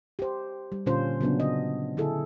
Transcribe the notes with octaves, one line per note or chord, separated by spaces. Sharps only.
G4 C5
G3
A#2 D3 C#4 F4 C5
C#3 F#3 B3 D4
D#5
D3 E4 G#4 A4